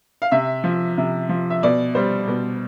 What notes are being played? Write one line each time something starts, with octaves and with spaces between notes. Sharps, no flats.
F5
C3 E5
F3
C3
F3
E5
B2 D5
G3 C5
B2